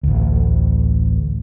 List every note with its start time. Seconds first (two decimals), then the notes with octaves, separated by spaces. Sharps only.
0.03 A1 D2